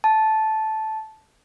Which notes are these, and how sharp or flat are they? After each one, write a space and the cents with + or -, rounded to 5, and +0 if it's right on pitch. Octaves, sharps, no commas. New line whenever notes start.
A5 -10